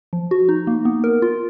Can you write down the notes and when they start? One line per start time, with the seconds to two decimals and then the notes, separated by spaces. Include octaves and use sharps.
0.13 F3
0.31 F#4
0.49 D#4
0.67 A#3
0.85 B3
1.04 A#4
1.22 F4